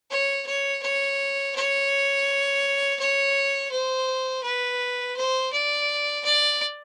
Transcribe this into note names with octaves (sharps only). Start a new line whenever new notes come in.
C#5
C#5
C#5
C#5
C#5
C5
B4
C5
D5
D5